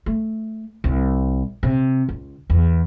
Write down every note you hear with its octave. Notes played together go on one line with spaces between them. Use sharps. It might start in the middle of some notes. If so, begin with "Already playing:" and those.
A3
C2
C3
C#2
E2